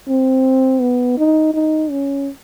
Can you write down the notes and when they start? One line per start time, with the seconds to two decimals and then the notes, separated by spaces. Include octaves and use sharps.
0.08 C4
0.81 B3
1.18 D#4
1.53 D#4
1.90 C#4